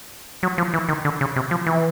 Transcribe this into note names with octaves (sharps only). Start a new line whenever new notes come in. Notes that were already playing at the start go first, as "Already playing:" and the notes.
F#3
F3
E3
D#3
D3
C#3
C3
F3
E3